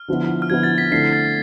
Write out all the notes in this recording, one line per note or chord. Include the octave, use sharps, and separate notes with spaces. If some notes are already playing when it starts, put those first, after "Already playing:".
Already playing: F6
D3 F3 B3 E4
F6
D3 F3 B3 E4 G#6
A6
B6
D3 A3 C4 E4 C7
A6